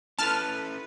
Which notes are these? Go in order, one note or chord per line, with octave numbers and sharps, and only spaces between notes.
C#4 E4 A4 B4 A5 F6